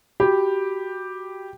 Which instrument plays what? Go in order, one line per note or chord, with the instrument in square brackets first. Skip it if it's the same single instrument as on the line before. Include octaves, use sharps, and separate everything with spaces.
[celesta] F#4 B5 [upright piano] G4